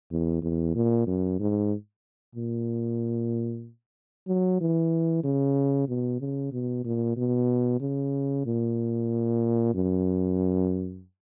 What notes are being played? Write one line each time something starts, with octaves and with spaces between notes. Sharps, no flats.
E2
E2
A#2
F#2
G#2
A#2
F#3
E3
C#3
B2
C#3
B2
A#2
B2
C#3
A#2
F#2